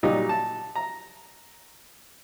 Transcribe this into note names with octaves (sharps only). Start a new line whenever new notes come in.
A#2 F#3 G3 D#4 G4
A5
A#5